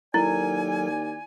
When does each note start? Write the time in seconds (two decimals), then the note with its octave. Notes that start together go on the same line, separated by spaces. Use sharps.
0.14 D#2 F#3 E4 A4 A#4 D5 G#5